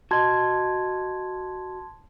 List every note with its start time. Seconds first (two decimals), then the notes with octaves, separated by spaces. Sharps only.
0.11 F#4 D#5 A5 C6 G#6